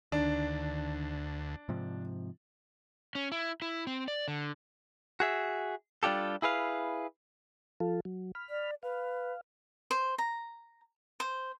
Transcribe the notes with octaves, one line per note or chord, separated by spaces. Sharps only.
D2 D#3 D4
G#2 C3 F3
C#4
E4
E4
C4
D5
D3
F#4 G#4 E5
G3 D4 F4 G4 A4
E4 G#4 B4 F5
F3 F4 A4
F#3
B5 F6
D5
B4 F5
C5
A#5
C5